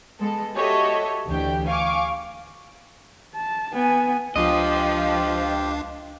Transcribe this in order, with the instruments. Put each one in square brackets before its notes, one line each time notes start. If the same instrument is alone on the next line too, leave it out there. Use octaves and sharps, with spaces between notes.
[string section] G#3 B3 A4
F#4 G4 A4 C#5 D#5 E5
D2 E3 D4 G4 G5
F5 G#5 C#6 D6
[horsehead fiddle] A5
B3 G#5
[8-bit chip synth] C#2 D4 F5 [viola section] F3 [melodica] F4 G4 G5 [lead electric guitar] D#5